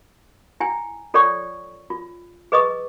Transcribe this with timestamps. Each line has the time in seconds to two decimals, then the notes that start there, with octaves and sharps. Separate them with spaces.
0.60 E4 G5 G#5
1.14 F4 A4 C#5 D5 G5 C#6
1.90 F4
2.52 G#4 B4 D#5 C#6 D#6